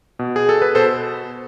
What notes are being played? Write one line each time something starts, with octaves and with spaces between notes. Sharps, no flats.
B2
G#4
A4
B4
B2 A4 C5